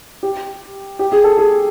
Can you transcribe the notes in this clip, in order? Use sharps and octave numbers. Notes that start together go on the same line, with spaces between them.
G4
G4
G#4
A4
G#4